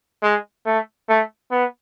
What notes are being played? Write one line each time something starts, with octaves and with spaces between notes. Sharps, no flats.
G#3
A3
A3
B3